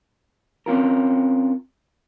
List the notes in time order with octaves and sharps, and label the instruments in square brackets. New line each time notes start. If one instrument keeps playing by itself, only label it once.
[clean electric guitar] C4 C#4 F4 A#4